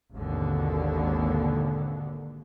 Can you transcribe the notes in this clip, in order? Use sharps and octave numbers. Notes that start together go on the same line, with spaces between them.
G#1 D#2 B2 D3